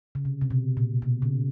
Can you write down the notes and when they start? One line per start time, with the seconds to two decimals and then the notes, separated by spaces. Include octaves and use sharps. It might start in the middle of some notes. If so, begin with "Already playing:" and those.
0.15 C#3
0.25 C3
0.41 C3
0.51 B2
0.77 A#2
1.02 B2
1.22 C#3